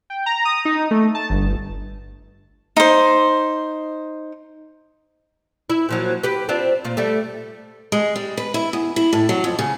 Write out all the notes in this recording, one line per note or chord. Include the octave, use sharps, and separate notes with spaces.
G5
A#5
D#6
D#4
A3
A5
G1
D#4 C5
E4
A#2 F3 F#3
G4 B4
C4 D4 F4
A#2 F4
G3 A3
G#3
G3
B4
E4
E2
E4
A2
F#3
F2
C#3